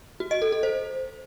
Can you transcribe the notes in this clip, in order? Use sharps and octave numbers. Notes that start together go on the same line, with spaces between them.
F#4
D#5
A4
A4
C5